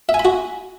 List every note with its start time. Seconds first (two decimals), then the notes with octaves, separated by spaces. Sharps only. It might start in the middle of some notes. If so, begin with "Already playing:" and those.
0.09 E5
0.14 G#5
0.19 B5
0.25 F#4